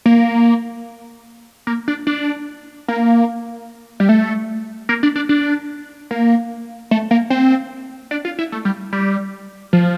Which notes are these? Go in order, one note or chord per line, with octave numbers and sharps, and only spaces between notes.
A#3
A#3
D4
D4
A#3
G3
A3
A#3
D4
D4
D4
A#3
A3
A#3
C4
D4
F4
E4
A3
G3
G3
F3